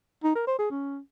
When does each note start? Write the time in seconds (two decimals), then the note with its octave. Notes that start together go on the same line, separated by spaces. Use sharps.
0.24 D#4
0.35 A#4
0.47 C5
0.59 G#4
0.71 C#4